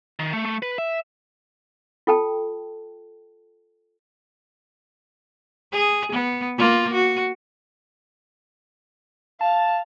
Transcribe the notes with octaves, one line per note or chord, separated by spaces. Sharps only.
D#3
A3
A3
B4
E5
F4 A4 G5 A5
G#4
B3
A#3 F4
F#4
F5 A5